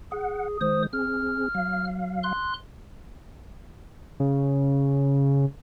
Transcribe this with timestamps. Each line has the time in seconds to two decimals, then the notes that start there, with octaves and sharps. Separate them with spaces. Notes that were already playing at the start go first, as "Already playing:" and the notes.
0.12 G#4 F#5
0.61 D#3 G#3 C5 D#6
0.93 C4 G#4 F6
1.55 F#3 F5
2.23 C6 F#6
4.20 C#3